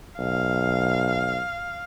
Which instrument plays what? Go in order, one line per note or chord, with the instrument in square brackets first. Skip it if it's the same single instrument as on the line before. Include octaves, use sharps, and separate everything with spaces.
[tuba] B1 [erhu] F5